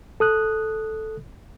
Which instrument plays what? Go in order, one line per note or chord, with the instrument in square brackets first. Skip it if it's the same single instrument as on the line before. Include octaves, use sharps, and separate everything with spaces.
[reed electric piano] A4 D#6 F#6